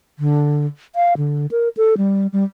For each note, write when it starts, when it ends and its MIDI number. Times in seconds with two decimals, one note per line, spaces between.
0.19 0.66 50
0.95 1.14 77
1.17 1.46 50
1.51 1.69 70
1.77 1.97 69
1.97 2.27 55
2.33 2.44 55